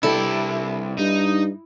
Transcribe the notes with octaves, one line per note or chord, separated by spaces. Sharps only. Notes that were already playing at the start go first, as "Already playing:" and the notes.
C2 B3 D4 E4 G4 A4
G2 D#4